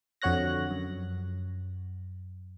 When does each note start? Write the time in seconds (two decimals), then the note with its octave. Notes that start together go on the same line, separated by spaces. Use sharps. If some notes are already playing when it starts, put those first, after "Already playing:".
0.22 F2 D3 F#4 C#5 F#6 A#6
0.71 F#2